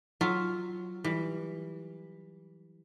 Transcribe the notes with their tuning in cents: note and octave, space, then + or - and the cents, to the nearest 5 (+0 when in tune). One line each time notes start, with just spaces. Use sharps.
F#3 +0 F4 +0 E5 +0
E3 -10 G3 +10